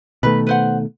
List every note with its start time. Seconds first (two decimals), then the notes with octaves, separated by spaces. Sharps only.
0.23 B2 D#3 A3 B4
0.47 B4 C5 F#5